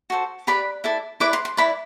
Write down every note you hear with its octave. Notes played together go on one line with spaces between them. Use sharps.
F#4 A4 C5
G4 B4 D5 B5
E4 A4 D5
E4 B4 D5 D6
C6
C6
E4 B4 D5 B5